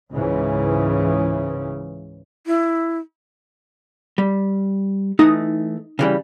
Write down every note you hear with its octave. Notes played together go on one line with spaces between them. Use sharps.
C#2 G#2 C#3 E3
E4
G3
E3 A3 D#4
C#3 E3 G3